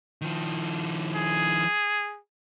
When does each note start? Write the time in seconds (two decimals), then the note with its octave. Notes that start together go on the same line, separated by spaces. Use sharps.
0.21 D#3 F3
1.15 G#4